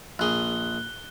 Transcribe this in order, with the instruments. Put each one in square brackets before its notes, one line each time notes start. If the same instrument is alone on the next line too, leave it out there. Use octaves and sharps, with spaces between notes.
[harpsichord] A#1 G#4 [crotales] F#6 G7